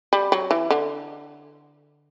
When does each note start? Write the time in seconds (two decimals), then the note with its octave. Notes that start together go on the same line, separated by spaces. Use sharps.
0.13 G3
0.32 F#3
0.51 E3
0.70 D3